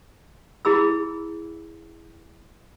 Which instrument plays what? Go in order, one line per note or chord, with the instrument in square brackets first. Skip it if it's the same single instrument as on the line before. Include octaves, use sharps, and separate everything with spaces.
[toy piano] E4 G#4 B5 E6